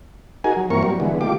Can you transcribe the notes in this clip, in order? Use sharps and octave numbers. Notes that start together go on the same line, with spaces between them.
D#4 F#4 G#4 A#4 G#5
F#3
G2 E3 A#3 C4 A#4 C#6
F#3 G3
D3 E3 G#3 B3
D#3 A3 F4 G4 D6